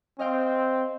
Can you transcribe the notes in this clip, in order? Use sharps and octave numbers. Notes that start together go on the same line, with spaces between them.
C4 D#5 F5 G5